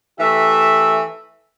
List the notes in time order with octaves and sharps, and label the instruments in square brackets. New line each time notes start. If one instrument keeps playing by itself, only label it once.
[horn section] E3 A3 G4 E5